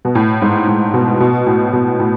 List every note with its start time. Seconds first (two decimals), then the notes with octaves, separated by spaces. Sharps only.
0.05 B2
0.15 A2
0.42 G#2
0.68 A2
0.94 B2
1.20 B2
1.47 A2
1.73 B2
1.99 A2